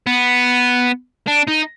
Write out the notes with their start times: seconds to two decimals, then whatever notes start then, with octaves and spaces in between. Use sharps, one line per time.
0.07 B3
1.27 D4
1.47 D#4